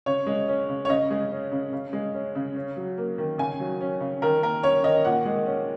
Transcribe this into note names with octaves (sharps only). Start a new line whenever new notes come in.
C#3 C#5
G#3
C#4
C#3
C#5
C#3 D#5
G#3
C#4
C#3
C#3
G#3
C#4
C#3
C#4
F#3
A#3
D#3
C#3 G#5
F#3
C#4
C#3
D#3 A#4
A#3 A#4
C#4 C#5
D#3 D#5
A#2 F#5
G#3
C#4